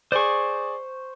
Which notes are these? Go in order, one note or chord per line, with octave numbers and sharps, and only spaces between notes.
G#4 C5 D5 C#6